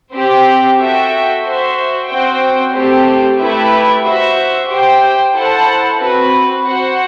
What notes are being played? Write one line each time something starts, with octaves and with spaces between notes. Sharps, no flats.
C4 G4 C5
F#4 A4 E5 G5
F#4 C5 E5
C4 F#4 C5 G5
A3 C4 G4 C5
A3 E4 G4 B4 E5
F#4 C5 E5
G4 C5 G5
E4 A4 C5 F#5 A5
C4 F#4 B4
F#4 C5 F#5